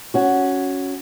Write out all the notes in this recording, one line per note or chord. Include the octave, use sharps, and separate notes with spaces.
C#4 F#4